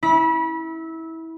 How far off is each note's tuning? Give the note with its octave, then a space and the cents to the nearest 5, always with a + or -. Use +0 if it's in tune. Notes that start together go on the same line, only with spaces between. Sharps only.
E4 -20 B5 -30